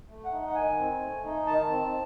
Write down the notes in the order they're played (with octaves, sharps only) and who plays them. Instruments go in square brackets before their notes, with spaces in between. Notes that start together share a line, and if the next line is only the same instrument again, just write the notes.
[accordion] A3
F#5
D#4
F#5
D#3 G#5
C4
A3
D#4
D#3 A5
C4